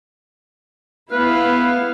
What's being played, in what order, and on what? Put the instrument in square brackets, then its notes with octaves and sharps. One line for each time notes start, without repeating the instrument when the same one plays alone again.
[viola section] B3 E4 F5 [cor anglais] B4